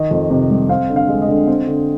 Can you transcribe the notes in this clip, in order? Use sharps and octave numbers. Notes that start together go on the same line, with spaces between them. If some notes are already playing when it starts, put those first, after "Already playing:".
Already playing: D#3 D#5
F2
C3
G3
C4 F5
D3
F5
G#3
D#5
D3
C4
D3